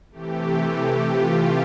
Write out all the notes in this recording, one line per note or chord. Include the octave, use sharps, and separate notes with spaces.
C3 E3 A3 G4
G4
F4